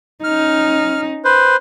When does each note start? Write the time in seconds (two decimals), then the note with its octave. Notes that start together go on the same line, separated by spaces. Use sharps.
0.24 C#4 D#4 F6
1.25 B4 C5